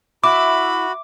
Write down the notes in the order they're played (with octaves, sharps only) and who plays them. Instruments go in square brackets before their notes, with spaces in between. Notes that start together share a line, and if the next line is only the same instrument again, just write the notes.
[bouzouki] E4 [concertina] F#4 [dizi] B5 [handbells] D6